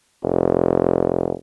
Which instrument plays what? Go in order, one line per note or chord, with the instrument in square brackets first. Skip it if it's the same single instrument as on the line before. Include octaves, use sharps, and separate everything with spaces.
[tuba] F1